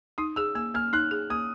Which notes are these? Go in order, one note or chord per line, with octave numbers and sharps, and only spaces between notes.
D#4 D#6
G#4 E6
A#3 E6
A#3 F6
D#4 F#6
G#4
A#3 D#6